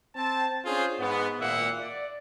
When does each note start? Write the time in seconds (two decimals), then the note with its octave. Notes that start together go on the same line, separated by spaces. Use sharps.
0.15 C4 A5
0.65 C#4 D4 F4 G#4 C5
0.99 G#2 B3
1.40 G#1 A#2 A#3 E5 F#5
1.80 D5